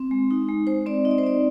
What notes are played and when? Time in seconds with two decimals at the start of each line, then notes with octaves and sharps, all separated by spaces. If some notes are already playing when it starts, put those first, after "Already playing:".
Already playing: C4
0.11 G#3
0.31 D#4
0.48 G#3
0.67 G#3 C5
0.86 C4 D5
1.05 D#4 D#5
1.11 D5
1.18 C5
1.24 C4 D5